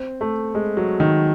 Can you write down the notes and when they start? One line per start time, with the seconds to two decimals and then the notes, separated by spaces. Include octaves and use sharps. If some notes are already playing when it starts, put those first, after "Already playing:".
Already playing: C4
0.21 A3
0.55 G#3
0.77 F#3
1.00 D#3